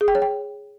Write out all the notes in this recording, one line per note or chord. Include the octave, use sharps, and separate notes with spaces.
G#4
G5
C#5
G5